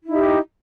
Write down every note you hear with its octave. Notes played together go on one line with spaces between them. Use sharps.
D#4 E4 G4